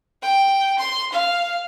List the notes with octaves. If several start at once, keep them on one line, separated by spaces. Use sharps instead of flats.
G5
C6
F5